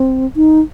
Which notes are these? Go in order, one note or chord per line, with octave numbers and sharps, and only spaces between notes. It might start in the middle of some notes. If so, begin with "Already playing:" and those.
Already playing: C4
D#4